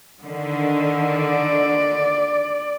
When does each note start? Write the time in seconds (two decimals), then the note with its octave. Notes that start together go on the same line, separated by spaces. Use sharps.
0.24 D3 D#3
1.11 D5